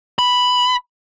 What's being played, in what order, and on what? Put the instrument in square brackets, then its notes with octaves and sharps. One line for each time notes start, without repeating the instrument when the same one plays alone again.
[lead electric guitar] B5